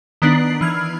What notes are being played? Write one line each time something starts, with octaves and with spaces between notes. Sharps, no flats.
D#3 B3 D4 C7 F#7
E3 F6 G#6